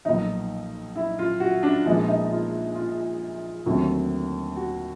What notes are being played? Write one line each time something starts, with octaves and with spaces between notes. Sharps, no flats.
B1 A#2 F3 D#4
E4
F4
F#4
D4
A#1 A#2 F3 G#3 B3 D#4
D#4
F4
F4
D#2 D3 F#3 A3 C4
F#4